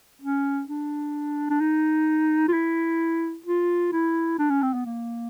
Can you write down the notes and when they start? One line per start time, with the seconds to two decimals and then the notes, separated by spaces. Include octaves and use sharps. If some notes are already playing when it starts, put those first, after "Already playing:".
0.22 C#4
0.68 D4
1.50 D4
1.60 D#4
2.48 F4
2.53 E4
3.46 F4
3.92 E4
4.39 D4
4.50 C#4
4.62 C4
4.74 B3
4.85 A#3